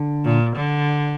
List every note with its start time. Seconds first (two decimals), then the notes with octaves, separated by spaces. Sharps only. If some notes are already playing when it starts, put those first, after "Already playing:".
Already playing: D3
0.24 A#2
0.56 D3